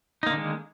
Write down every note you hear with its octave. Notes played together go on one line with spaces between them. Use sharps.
D3 D#3 G#3 A#3 D#4